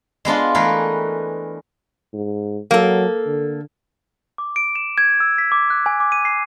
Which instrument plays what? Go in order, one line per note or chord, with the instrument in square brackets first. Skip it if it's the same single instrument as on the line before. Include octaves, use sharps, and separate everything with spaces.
[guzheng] G#3 B3 D4 F4
E3 A3 G#4 A#4 B4
[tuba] G#2
[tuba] F#3 [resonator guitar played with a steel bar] A#3 A4
[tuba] D3
[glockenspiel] D6
D7
E7
G#6
E6
B6
D6
F#6
G#5
D6
D#7
C7